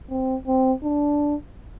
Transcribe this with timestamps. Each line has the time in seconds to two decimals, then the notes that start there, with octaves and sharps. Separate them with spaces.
0.10 C4
0.47 C4
0.84 D4